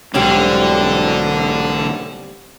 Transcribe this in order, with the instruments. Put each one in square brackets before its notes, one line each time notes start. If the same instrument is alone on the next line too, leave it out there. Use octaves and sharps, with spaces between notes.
[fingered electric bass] B1 G#2 [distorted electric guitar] D3 [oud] G3 C4 C#4